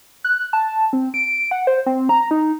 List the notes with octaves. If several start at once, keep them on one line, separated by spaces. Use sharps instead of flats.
F#6
A5
C4
D7
F#5
C5
C4
A#5
D#4